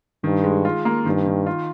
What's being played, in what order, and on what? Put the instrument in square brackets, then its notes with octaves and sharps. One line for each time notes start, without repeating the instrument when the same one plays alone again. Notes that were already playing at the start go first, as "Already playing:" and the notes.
[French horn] G2 [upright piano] D#3
[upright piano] G#3
F4
A#3
[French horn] G2 [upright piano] D#3
[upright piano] D#3
F4